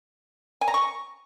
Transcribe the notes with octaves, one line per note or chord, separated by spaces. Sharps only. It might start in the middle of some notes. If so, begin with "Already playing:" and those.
G#5
A#5
C#6